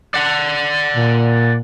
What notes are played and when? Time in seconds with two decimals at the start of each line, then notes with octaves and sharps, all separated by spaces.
0.14 D5 F#5
0.96 A#2